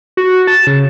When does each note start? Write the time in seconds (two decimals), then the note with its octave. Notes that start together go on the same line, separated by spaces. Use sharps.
0.17 F#4
0.47 A5
0.67 C#3